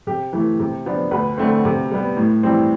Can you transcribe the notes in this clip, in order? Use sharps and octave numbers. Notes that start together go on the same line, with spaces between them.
C3 G4
E3 A3
C3
F3 B3 D4
D2 B4
D3 A3 C4
C3
G3 B3
A2
E3 G3 C4